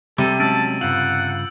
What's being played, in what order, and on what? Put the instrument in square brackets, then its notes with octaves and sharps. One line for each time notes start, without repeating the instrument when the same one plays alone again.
[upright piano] C3 [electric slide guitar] G3 [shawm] A4
[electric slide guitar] F#3 G#3 C#4 [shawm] A5 [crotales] E6 A6 D7
[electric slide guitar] G2 C#3 F4 [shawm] F#5 [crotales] G6 F#7